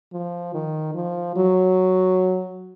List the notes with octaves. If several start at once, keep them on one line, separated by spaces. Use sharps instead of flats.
F3
D#3
F3
F#3